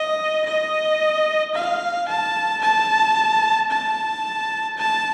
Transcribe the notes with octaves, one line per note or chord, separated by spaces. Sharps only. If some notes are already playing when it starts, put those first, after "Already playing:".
Already playing: D#5
D#5
F5
A5
A5
A5
A5